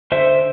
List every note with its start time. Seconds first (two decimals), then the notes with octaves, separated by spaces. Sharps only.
0.12 D3 C5 E5